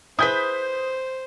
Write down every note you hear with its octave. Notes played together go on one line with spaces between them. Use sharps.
E4 G#4 B4 C5 D#6 G6 B6